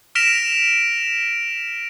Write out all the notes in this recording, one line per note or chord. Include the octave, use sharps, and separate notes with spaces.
F6 A#6 B6 D7 E7 F7